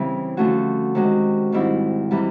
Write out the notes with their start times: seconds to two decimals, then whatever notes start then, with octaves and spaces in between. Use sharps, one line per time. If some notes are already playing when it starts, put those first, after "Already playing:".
Already playing: C#3 E3 G3 C4 E4
0.37 D3 F3 A3 C#4 F#4
0.95 C3 D#3 G#3 C#4 F#4
1.52 G#2 D#3 G3 C4 E4
2.11 C3 E3 G3